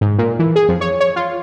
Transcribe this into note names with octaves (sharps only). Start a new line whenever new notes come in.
G#2
A#2
E3
G#4
F2
C#5
C#5
F4